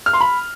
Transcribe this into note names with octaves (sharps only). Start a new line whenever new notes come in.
F6
C6
B5